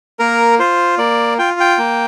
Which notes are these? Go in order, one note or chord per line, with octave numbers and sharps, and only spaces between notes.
A#3 A#4
F4 C5
A#3 D5
F4 G5
G5
A#3